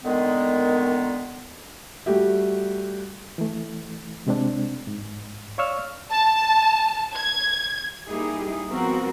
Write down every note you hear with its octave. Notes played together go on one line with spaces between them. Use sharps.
A#2 D3 D#3 G#3 B3
G3 A3 F#4 G4 E5
E3 A3
C3 G#3 C4 D4
G#2
C#5 D5 F5 C#6 E6 F6
A5
G#6
G3 A#3 D#4 E4 G4 G#4
F3 G#3 B3 C4 F#4 A#4